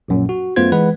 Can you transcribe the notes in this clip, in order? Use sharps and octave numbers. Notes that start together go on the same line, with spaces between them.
A#1 F#2 A#2
F#4
F#2 A3 B3 F4 C5 G#6
E3 G#3 B4 F#5